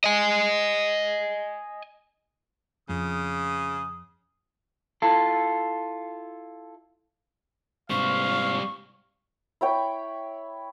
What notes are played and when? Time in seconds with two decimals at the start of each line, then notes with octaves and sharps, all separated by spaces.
0.04 D#5 G#5
2.89 F2 C#3 D#6
5.02 E4 F4 A4
7.90 G#2 C3 G3 C5 F5 C#6
9.61 E4 C#5 G5 B5